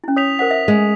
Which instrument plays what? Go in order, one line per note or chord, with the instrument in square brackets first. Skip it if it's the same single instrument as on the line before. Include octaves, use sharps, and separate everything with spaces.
[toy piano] C#4 E4
[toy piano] C#5 [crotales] D#6 B6 F7
[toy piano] A#4 C5 F#5 [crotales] B6
[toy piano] E5
[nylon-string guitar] G#3